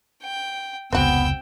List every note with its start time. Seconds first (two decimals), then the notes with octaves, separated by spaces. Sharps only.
0.23 G5
0.92 F1 C#2 B3 C4 F#4 G5 E6